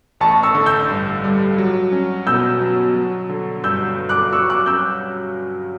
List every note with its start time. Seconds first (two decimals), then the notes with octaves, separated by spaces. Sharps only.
0.20 A1 A5 C#6
0.43 C#6 E6
0.55 D3
0.66 E6 G6
0.90 G2
1.24 G3
1.58 F#3
1.92 C#4
2.27 B2 E6 G6
2.61 F#3
2.95 F#3
3.29 D3
3.64 G2 E6 G6
3.99 G2
4.09 D6 F#6
4.32 F#3 C#6 E6
4.50 D6 F#6
4.66 C#4 E6 G6